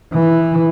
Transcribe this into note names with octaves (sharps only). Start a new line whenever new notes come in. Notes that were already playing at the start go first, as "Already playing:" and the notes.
E3